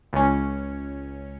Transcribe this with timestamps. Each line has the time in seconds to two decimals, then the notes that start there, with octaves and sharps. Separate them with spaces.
0.13 C#2 C#4